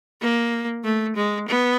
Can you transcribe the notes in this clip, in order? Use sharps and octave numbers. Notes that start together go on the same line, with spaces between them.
A#3
A3
G#3
B3